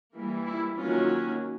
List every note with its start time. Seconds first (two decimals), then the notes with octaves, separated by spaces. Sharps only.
0.14 E3 G3 A#3
0.46 E4
0.77 D#3 F#3 A#3 C#4 F4